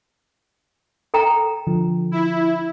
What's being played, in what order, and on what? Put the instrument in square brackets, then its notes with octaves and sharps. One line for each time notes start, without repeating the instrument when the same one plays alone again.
[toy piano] A4 G5 A#5
[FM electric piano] D3 F3
[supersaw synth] E4